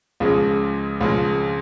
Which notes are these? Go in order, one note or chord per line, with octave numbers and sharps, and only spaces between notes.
C#2 C#3 F3 G#3
C#2 C#3 F3 G#3